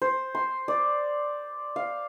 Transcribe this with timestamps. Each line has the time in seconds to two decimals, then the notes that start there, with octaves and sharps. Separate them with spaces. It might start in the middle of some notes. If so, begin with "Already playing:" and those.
0.02 C5
0.35 C6
0.68 D5
1.76 F5